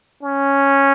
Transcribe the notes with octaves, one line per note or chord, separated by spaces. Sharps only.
C#4